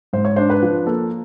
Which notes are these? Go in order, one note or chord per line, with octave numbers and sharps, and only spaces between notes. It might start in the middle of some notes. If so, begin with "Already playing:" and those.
G#2 C5
C#5
D4 C5
B4
F3
A#3 A4